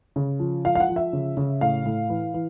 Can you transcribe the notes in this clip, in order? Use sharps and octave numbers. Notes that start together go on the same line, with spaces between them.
C#3
F3
F3 F5
F5
F#5
F3
E5
C#3
C#3
A2 F5
A2
E3
E3